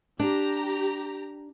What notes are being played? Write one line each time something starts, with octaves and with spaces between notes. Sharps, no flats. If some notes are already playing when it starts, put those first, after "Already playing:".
D4 G4 A#5